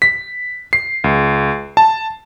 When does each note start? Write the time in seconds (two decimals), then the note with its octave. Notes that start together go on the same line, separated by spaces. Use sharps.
0.02 B6
0.73 C7
1.04 C#2
1.77 A5